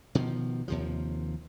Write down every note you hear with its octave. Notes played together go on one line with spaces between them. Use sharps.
B2 D#3 F3
D#2 C3 F3